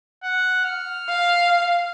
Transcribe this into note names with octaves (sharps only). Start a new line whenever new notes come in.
F#5
F6
F5